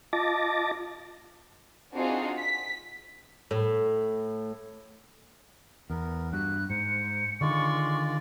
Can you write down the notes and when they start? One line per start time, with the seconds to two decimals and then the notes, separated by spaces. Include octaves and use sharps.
0.13 F4 D#5 A5 D6 A6 A#6
1.95 C4 D4 D#4 F4 F#4 G#4
2.38 B6
3.51 A2
5.90 E2 B3 A#4
6.33 G2 F#4 F#6
6.70 G#2 C5 C#7
7.41 D3 D#3 G#3 F4 D5 C#6